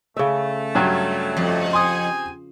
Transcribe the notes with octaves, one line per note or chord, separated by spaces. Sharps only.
C#3 A3 E5
G2 F#3 G3
F2
C4 G4 G#5 C6 D#6